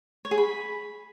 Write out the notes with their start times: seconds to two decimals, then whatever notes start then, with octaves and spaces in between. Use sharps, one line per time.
0.25 C#5
0.31 G#4
0.38 B5